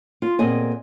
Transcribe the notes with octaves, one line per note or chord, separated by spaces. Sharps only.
F4
A#2 B3 C4 G#4 D#5 G#5